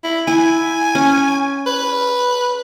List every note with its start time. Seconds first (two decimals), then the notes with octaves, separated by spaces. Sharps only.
0.04 E4
0.27 E4 G#5
0.95 C#4
1.66 B4